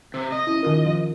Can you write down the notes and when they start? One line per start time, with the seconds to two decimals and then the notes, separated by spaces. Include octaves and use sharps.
0.14 C3
0.32 D#5
0.47 C#4 E4
0.63 D#3 F4 A#4
0.86 F3